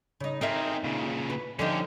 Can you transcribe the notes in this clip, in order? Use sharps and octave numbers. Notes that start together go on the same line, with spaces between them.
C#3 D#4
C4 D#4 G#4 A#4 E5
A#2 C#3
B4
D3 F3 C#4 D#4 G4